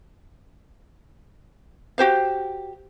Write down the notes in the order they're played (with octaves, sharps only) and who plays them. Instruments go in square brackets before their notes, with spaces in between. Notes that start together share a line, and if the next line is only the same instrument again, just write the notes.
[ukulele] F#4 G4 C5 F5